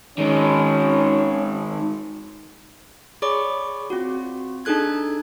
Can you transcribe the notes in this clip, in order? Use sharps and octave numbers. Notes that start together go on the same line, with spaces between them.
D#3 G#3 C#4
G#4 C#5 D5 B5 C#6 D6
C4 F4 F#4
D4 D#4 G#4 A4 F#6 G#6